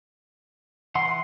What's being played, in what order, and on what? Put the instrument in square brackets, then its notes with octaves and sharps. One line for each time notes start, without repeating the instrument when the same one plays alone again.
[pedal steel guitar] E3 F#5 C6 [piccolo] C7